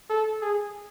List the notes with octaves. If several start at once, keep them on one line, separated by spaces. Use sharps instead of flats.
A4
G#4